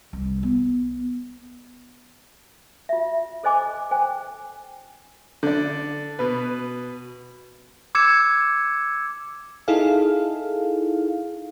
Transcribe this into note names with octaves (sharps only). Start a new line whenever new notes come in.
C2
B3
F4 E5
A4 C5 D#5 G#5 D6
C5 G5 G#5
D3 D5
B2 B4
D6 E6 G#6 C#7 E7
D#4 E4 G#4 A4 F5